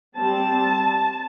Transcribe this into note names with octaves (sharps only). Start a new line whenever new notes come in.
G3 C4 A5